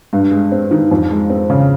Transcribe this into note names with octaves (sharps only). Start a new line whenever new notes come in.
G2
G#3
C4
D#3
F2
G#3
C4
C#3